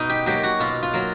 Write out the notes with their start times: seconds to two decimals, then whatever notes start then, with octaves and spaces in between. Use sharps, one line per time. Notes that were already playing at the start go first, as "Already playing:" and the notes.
Already playing: B2 D#4
0.10 G4
0.26 F#3 A#3 G4
0.43 F#4
0.60 B2 F4
0.83 F4
0.93 F#3 A#3